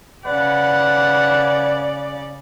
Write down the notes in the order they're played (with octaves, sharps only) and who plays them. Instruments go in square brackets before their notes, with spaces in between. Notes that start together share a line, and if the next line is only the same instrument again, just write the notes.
[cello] C#3 D5 [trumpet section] B4 F#5